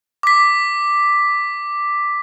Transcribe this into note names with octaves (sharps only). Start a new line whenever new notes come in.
D6 B6